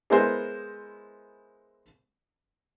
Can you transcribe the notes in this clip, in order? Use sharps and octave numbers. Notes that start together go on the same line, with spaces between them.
G#3 B3 E4 G#4 A#4 C5